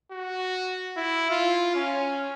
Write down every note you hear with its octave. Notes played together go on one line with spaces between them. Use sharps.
F#4
E4
F4
C#4